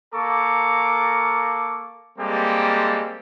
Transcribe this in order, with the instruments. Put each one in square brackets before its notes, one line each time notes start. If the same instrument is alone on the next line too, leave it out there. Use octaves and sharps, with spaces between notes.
[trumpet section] A#3 A4 A#5 C#6 D6
G3 G#3 A#3 C4 G4 A4